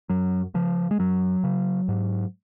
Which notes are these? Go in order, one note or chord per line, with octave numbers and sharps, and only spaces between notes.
F#2 F#3
C#3 F3
G#3
F#2 F#3
C#3
G#2